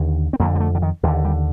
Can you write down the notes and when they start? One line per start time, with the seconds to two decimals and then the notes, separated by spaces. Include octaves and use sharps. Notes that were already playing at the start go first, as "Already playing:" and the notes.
Already playing: D#2 D3
0.33 C4
0.40 F2 A#3
0.43 D3
0.55 G3
0.60 A3
0.75 D3
0.82 D#3
1.03 D#2 F3
1.07 D3
1.25 G3